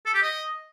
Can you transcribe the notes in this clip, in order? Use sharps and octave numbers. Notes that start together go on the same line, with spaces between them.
A4
G4
D#5